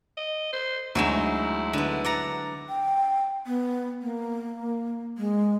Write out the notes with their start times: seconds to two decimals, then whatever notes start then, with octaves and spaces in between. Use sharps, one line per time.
0.17 D#5
0.53 C5
0.95 D2 F#3 G#3 D#4 E4 E7
1.73 D3 B3
2.04 D5 F#5 A#5
2.69 G5
3.46 B3
4.02 A#3
5.18 G#3